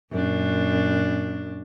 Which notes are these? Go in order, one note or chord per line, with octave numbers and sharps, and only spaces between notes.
F#2 A#2 D4